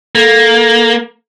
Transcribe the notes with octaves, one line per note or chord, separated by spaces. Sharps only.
A#3 A4